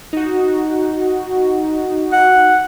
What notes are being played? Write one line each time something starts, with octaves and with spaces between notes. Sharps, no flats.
D#4 F#4
F#5